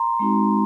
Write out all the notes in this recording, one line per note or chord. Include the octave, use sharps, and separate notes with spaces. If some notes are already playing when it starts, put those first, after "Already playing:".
Already playing: A#5 C6
G#3 C4 D#4 F#4